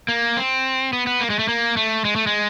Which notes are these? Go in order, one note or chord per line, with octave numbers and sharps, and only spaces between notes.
A#3
C4
B3
B3
A#3
G#3
A3
A#3
A3
G#3
A3
G#3